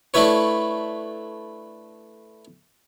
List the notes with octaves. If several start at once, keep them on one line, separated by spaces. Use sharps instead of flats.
A3 D4 E4 B4 C#5